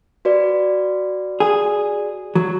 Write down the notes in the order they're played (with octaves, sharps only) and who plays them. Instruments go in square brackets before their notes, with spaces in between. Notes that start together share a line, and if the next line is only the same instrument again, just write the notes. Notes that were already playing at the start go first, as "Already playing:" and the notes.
[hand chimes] F#4 B4 D5
[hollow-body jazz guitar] G#4
F#3